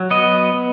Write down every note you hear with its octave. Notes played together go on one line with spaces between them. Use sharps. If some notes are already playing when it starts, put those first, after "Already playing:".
Already playing: F#3
B3 D#5
B3